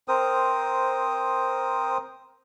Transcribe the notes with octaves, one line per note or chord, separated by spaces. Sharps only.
C4 A#4 C5 D#6